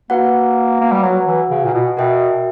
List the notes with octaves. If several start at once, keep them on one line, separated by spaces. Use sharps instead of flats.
A#3 F#4 B4 F#5
A#3
G3
F#3 F#4 B4 F#5
E3
C#3
A#2
B2
B2 F#4 A#4 E5 G5